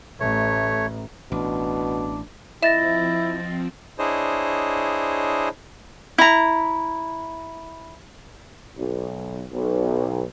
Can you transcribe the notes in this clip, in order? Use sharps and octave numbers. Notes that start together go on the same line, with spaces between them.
A1 A3 C#5
A1 B2 D4
F3 C4 E4 D#5 E5 A6 A#6 E7
D4 E4 G#4 C5 C#5 D#5
E4 A#5
B1
B1